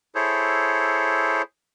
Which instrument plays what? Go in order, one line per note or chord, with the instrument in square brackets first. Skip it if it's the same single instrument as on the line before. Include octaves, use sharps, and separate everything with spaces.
[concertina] E4 G#4 A4 C5 C#5